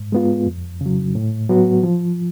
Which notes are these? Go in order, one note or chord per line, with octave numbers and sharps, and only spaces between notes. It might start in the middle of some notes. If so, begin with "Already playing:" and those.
Already playing: G#2
G#3 B3 F4
F2
C#3 F#3
A2
F#3 B3 F#4
F3